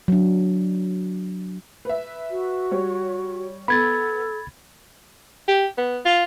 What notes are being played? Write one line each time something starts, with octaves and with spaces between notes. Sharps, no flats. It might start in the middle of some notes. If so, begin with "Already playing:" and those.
F#3 D4
B4 E5
F#4
G3 C#5
B3 A4 B5 G#6 A6
G4
B3
F4